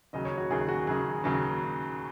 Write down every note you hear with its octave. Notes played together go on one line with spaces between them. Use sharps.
D#2 C#3 F#3 D#5
C#5
F#4
D#2 C#3 F#3 G#4
F#4
D#2 C#3 F#3 G#4
D#2 C#3 F#3